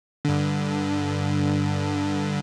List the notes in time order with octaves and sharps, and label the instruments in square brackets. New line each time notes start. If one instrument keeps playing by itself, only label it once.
[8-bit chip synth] G2 D3